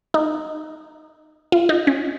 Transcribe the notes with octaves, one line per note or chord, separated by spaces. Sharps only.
D#4
F4
D#4
C#4